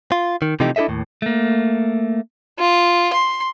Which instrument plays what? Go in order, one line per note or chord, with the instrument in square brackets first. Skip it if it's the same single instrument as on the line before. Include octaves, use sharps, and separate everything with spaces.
[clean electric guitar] F4
D#3
C3 E3 F3 A3 D#4 G4
D4 E4 G#4 A4 D#5 E5
D#2 A2
[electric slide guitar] A3 A#3
[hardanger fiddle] F4
C6